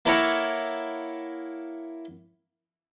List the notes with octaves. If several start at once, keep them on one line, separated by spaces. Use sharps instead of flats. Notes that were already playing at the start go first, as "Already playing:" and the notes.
A#3 E4 A4 A#4 C#5 F#5